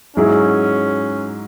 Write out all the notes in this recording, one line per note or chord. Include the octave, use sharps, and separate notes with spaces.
G#2 F#3 C#4 E4 G#4